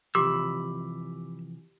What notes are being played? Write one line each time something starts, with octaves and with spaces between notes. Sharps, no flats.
C3 E3 F3 G4 B5 D6 E6